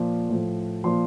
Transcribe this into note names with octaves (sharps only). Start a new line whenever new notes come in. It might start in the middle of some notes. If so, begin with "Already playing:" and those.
Already playing: A#2 F3
A2 F3
A#2 F3 C6